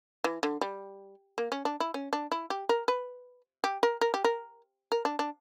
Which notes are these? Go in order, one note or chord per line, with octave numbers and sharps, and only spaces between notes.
E3
D3
G3
A#3
C#4
D4
E4
C#4
D4
E4
G4
A#4
B4
G4
A#4
A#4
G4
A#4
A#4
D4
D4